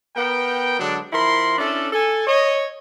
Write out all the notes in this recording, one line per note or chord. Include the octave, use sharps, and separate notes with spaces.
B3 A#4 G5
D3 F#3 G#3 D4
F3 E4 A#4 B5 C6
C#4 D4 E4 A4
A4 G#5
C#5 D#5